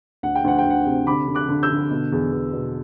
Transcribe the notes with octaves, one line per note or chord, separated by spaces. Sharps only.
D2 F#5
G5
D2 F#5
G5
D2 F#5
C3
D3 B5 D6
D3
D6 F#6
D3
E6 G6
D3
B2
E2
E2
B2